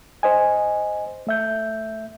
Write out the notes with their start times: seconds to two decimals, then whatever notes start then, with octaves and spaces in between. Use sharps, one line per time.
0.23 C5 D#5 G#5
1.27 A3 E5 G6